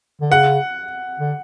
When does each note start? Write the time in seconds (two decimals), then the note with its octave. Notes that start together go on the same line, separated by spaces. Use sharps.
0.21 D3
0.32 C#3 F#5
1.19 D3